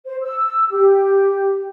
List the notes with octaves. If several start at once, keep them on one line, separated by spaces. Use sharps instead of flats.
C5
E6
G4